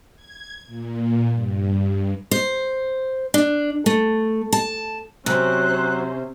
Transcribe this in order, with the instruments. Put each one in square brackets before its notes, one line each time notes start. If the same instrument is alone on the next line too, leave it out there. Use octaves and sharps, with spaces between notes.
[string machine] G#6
A#2
G2
[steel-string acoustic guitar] C5
D4
A3
A5
[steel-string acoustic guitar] C3 [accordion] F#3 [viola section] C#4 C5 [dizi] F#6